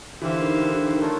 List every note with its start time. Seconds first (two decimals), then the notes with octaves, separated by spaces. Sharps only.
0.22 D3 E3 E4 G4 C5 F5
0.41 D#3
0.52 D#3
0.61 D3
0.73 D3
0.87 D#3
0.99 A3 D4 F4 A#4 C#5